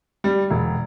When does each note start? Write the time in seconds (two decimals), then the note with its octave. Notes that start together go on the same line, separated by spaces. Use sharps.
0.24 G3
0.50 E1